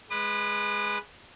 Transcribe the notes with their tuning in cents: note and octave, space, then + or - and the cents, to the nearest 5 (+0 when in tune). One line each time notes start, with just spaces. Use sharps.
G#3 +0 B4 +0 D#6 -40